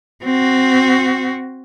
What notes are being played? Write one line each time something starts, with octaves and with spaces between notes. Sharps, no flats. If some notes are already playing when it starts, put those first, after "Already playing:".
C4 F#4